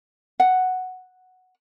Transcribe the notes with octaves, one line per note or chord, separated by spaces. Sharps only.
F#5